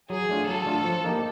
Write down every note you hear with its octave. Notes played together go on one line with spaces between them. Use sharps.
F#3 G#4
A3 D4 F4
F#3 A4
A3 D4 F4
F3
A#3 D#4 G4